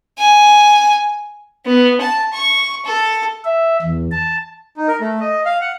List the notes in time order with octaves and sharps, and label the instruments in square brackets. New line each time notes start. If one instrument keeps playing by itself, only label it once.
[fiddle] G#5
B3
A5
C#6
A4
[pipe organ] E5
E2
A5
[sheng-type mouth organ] D#4
A#4
A3
D#5
F5
F#5